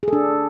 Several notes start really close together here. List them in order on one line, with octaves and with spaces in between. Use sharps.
G#4 A4 D4